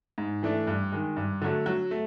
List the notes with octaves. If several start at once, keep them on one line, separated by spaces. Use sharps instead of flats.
G#2
E3 A3 D4
G2
D#3 G#3
G2
D3 F#3 A3
F#3
A3